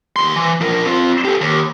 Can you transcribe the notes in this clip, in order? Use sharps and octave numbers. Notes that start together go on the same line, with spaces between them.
D#2 C6
E3
F3 A#4
C4 F4
G4 A4
D#2